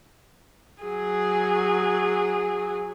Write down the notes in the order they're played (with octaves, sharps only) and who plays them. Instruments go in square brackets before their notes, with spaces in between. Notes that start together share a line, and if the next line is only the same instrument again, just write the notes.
[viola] F#3 G#4